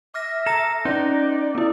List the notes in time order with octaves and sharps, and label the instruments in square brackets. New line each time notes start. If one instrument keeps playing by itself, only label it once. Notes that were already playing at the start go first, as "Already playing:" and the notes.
[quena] E5 [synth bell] D6 F6 A#6
[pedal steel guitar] A4 [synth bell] A#5 A#6
[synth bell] C#4 [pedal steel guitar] D#4 [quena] D5
[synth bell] B3 E4